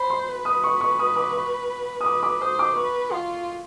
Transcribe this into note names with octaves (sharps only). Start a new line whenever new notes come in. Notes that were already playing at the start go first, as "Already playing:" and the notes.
Already playing: C5 B5
C6
B4
D#6
B4 C#6
C#6
D#6
D6
C#6
D#6
B4 D6
D6
C5 D#6
D6
B4 C#6
F4 C6